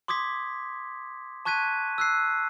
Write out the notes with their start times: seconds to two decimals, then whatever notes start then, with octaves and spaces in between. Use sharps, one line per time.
0.08 C6 D6 D#6 G#6 B6
1.45 A5 C#6 F#6 G#6 B6 D#7
1.98 E6 F#6 C7